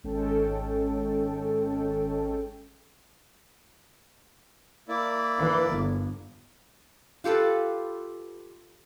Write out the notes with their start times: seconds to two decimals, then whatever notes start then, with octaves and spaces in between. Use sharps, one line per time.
0.04 G#1 G#3 C#4 A4 G5
4.89 A#3 E4 D5
5.38 E3
5.70 G1
7.24 F4 G4 A4 B4